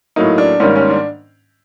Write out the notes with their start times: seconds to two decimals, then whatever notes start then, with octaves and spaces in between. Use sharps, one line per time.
0.16 A2 F#3 A#3 D#4
0.38 D4
0.60 G#2 D#3 G3 A#3 C#4
0.76 C#4
0.90 D4